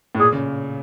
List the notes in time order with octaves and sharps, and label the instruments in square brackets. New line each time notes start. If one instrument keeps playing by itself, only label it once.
[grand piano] A2
[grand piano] A#2 [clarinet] G#4
[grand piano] C#3